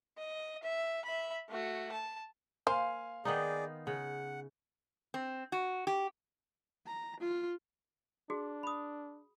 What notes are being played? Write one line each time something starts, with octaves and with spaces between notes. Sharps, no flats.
D#5
E5
E5 B5
A3 F#4
A5
A#3 C5 F5 G#5 C6
D#3 B3 D#4 G#4 D5
C#3 F#5
C4
F#4
G4
A#5
F4
D4 F#4 G#4
B5 D#6